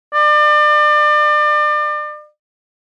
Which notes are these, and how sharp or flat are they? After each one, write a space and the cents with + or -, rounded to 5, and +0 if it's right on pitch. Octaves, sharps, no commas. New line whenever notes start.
D5 +35